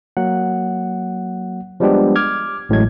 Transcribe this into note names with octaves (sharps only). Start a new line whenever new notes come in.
F#3 A#3 F#5
F3 G3 G#3 B3 D4 G4
D6 F6 G#6
A1 A2 F#3 G#3 G#6